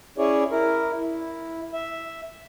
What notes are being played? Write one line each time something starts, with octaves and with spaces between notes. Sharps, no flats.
C#4 E4 G#4 C#5 D5
E4 A#4
E4
E5